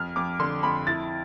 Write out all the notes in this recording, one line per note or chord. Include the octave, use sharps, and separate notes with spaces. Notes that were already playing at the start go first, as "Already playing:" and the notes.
Already playing: F2 F6
F2 D6
D3 C6
F2 B5
E4 A6